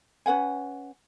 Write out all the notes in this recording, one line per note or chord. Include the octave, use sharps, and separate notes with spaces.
C#4 B4 F#5 G#5